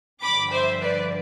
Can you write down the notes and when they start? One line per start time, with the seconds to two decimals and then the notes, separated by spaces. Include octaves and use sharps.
0.21 G2 D3 F3 B5 D6
0.51 C5 E5
0.80 B4 D5